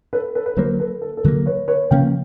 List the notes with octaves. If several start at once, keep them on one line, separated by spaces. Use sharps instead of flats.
A4 B4
A4 B4
B4
D3 F#3 A#3 A#4 C5
A4 B4
A4
A4
D3 F#3 A#3 A#4
B4 C#5
B4 C#5
C#3 F3 A#3 C#4 F5 G5